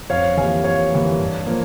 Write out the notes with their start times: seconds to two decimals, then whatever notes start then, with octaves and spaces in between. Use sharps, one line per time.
0.10 F2 C#5 F5
0.37 E3 G3 A#3 F5 G#5
0.64 F2 C#5 F5
0.92 E3 G3 A#3
1.19 G2
1.46 F3 A#3